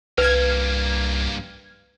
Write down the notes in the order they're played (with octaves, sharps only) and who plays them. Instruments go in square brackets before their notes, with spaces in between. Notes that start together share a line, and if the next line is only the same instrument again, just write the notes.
[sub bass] C2 [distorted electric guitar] G2 A#3 [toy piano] B4 [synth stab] F6 G#6